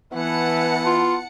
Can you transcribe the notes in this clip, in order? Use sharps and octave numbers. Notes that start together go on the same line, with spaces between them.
E3 B3 F#5 A5 C#7
F4